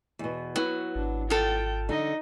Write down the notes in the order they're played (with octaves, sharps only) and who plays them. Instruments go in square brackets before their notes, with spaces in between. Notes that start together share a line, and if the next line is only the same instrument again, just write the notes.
[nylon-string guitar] E2 B2
[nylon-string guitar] F#3 B3 E4 [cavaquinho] F#4
[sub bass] G#1 [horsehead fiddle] D4
[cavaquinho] F4 A4 [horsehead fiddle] G5
[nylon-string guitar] D3 [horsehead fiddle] D#4 D#5